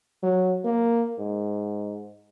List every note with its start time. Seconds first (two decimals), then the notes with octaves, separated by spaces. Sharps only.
0.23 F#3
0.64 A#3
1.18 G#2